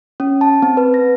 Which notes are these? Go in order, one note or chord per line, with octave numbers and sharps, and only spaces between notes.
C#4
A5
C4
B4
A#6